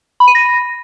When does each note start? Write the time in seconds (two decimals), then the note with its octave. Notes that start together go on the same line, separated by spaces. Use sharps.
0.20 B5
0.28 D#7
0.35 A#6